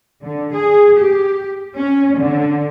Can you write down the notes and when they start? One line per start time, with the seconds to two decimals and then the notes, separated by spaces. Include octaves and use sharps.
0.24 D3
0.54 G#4
0.97 G4
1.75 C#4
2.18 D3